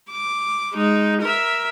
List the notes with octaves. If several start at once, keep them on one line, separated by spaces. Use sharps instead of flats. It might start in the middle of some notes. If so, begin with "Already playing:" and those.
D6
G#3 D#4
A#4 E5